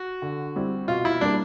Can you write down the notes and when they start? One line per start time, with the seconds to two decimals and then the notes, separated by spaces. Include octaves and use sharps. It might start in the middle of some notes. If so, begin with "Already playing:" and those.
Already playing: F#4
0.22 D3
0.56 G3 C4 E4
0.88 B2 F4
1.05 E4
1.21 G3 A#3 D4